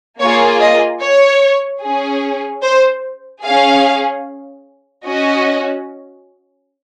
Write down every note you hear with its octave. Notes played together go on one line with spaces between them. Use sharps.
A#3 F4 G#4 C#5
D#5
C#5
C#4 G#4
C5
C#4 G#4 F5
C#4 F#4 D#5